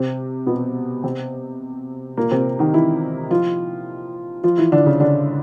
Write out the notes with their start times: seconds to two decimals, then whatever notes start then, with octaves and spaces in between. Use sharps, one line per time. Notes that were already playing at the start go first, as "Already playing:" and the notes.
Already playing: C3 C4
0.46 B2 B3
1.04 C3 C4
2.17 A#2 A#3
2.31 C3 C4
2.59 D#3 D#4
2.73 E3 E4
3.30 F3 F4
4.44 F3 F4
4.58 E3 E4
4.72 D3 D4
4.86 C#3 C#4
5.00 D3 D4